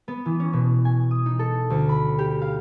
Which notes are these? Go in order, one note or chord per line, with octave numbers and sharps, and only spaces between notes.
B3
E3
C#4
B2
G#5
D#6
D#4
A4
D2
B5
G4
F5